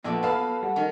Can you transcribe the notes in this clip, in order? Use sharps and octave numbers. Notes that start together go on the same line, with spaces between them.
A#1 F#3 B3 A4 D5
A4 B4 F5 A5 B5
G3 F#5
D#3 C#4